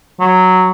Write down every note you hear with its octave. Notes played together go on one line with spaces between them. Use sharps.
F#3